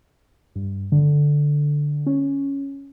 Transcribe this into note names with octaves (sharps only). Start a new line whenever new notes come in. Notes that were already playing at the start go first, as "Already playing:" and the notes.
G2
D3
C#4